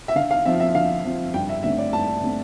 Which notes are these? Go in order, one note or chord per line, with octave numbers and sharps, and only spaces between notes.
E5
D3 F5
F5
F3 C4 E5
E5
D3 F5
F3 C4
G2 G5
E5
D3 A3 C4 E5
D5
G2 A5
D3 A3 C4